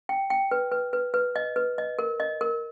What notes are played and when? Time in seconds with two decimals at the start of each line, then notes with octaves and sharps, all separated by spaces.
0.09 G5
0.30 G5
0.51 B4
0.72 B4
0.93 B4
1.14 B4
1.36 D#5
1.56 B4
1.78 D#5
1.99 A#4
2.20 D#5
2.41 A#4